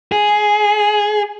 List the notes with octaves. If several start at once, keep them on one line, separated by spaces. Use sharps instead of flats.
G#4